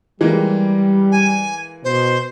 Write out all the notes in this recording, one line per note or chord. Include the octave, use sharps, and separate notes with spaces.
E3 G3 G#3 A#3
G#5
B2 C5